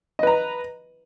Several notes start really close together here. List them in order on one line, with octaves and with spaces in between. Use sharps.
D#5 B4 A#5